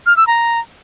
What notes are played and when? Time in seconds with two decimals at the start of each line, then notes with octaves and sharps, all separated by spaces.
0.06 F6
0.17 E6
0.27 A#5